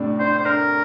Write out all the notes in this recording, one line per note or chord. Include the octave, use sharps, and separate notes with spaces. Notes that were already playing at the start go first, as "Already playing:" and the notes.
Already playing: A2 C3 D4
D4 C5
C5
D4 A#4